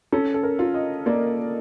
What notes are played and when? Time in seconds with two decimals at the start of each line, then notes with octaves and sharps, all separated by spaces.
0.12 C#4 A4
0.34 A4
0.43 A#4
0.59 F4
0.74 D#5
1.06 A#3 D5